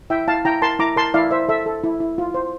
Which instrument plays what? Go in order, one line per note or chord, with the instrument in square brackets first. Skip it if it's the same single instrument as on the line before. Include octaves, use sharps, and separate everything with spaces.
[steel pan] E4 E5 G5
E4 F5 A5
E4 G5 A#5
A#4 A5 C6
E4 A#5 D6
A#4 A5 C6
E4 D5 F5
C5 E5
A4 E5
A4
E4
E4
F4
C5